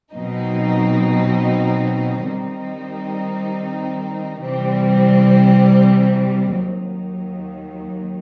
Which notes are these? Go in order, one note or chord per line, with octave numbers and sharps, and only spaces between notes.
B2 F#3 C4 D#4
D#3 G3 C4 D#4
C3 E3 G3 C4
D#2 D#3 F#3